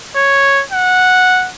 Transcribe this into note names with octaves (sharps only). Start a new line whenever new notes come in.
C#5
F#5